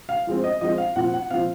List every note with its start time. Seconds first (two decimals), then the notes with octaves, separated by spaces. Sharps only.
0.09 F5
0.27 F3 G#3 C4
0.44 D#5
0.61 F3 G#3 C4 D#5
0.78 F5
0.96 A#2 F3 C4 F#5
1.14 F#5
1.31 A#2 F3 C4 F5